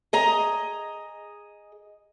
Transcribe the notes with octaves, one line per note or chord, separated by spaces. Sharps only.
G#4 D#5 A#5